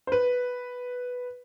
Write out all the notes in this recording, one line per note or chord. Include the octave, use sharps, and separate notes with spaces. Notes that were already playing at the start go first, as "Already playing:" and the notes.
C5
B4